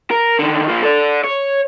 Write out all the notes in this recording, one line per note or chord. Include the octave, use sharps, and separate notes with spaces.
A#4
D3 D#3
F3 A#3
A4 D5
C#5